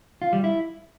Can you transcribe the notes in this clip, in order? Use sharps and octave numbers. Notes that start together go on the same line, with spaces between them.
F4
G3
E4